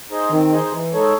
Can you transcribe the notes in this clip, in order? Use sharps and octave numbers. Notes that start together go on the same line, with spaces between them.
D#4 G#4 C5 D#5
D#3 C4
D#4 G#4 C5 D#5
E3
G#3 D#4 A4 C#5